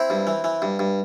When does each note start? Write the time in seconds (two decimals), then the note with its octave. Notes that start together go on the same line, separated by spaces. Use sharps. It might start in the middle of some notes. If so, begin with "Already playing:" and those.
Already playing: C4 E4
0.10 G2
0.27 E3
0.44 E3
0.62 G2
0.79 G2